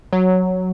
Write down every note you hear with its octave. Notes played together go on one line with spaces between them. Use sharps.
F#3